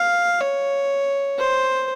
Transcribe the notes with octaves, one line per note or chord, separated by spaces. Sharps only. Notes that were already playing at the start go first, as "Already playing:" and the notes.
Already playing: F5
C#5
C5